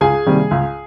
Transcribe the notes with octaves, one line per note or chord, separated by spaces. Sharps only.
C#2 G#4 G#5
C3 D#3 G3 A#3
C#2